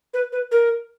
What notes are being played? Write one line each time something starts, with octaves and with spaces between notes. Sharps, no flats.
B4
B4
A#4